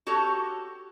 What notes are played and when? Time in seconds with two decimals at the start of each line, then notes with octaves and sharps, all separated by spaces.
0.07 F#4 G4 A4 C#5